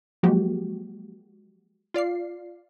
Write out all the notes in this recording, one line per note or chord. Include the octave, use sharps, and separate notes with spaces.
F3 F#3 G#3 A#3 F#4 G4
F4 D5 F5 C7